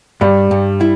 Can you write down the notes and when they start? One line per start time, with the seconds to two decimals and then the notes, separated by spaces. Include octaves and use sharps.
0.21 G2 G3
0.51 G2
0.81 E4